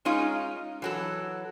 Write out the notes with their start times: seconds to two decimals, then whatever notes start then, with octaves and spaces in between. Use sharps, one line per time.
0.05 G#3 C#4 D#4 F4
0.82 E3 F#3 A4